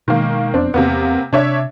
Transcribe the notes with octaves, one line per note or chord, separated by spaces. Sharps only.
B2 D#3 G#3 A#3
E1 F2 B3 C4 D4
E2 C3 A#3 B3
C3 D4 C#5 E5